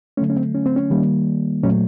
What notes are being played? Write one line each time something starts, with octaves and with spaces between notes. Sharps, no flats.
D3 F#3 A3 C#4
C#4
C4
C#4
C4
C#4
D#3 G3 A#3
A#2 F#3 A3 C#4